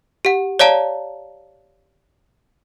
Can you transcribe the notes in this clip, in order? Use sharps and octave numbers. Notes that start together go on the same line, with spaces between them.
G4 F#5
C#5 D5 F5 A5 A#5